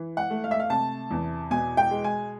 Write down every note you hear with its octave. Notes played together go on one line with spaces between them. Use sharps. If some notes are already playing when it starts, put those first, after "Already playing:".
Already playing: E3
F#5
A3
F5
E5
F5
C3 A5
E2
B2 G#5
G5
G#3
G#5